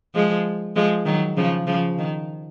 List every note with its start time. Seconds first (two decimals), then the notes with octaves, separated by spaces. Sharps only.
0.15 F3 G#3
0.76 F3 G#3
1.06 D#3 F#3
1.37 C#3 F3
1.67 C#3 F3
1.98 D#3